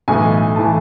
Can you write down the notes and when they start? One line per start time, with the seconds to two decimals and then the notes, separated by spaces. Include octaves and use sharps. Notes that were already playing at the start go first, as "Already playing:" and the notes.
0.08 B1 A2 E3 G#5
0.56 A2 E3 A5